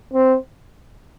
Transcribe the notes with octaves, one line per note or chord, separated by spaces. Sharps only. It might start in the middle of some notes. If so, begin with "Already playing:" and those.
C4